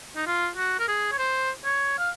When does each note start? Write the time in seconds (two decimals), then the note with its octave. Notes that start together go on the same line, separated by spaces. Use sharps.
0.16 D#4
0.27 F4
0.57 F#4
0.79 A#4
0.88 G#4
1.12 C#5
1.18 C5
1.65 C#5
1.98 F5